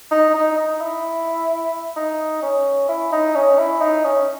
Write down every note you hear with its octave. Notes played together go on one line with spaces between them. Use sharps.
D#4
D#4
D#4
E4
D#4
C#4
E4
D#4
C#4
E4
D#4
C#4